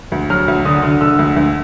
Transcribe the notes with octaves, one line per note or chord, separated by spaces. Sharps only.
D2
F#3 F6
D2
D3 D#6
D3
D3 E6
D2
D2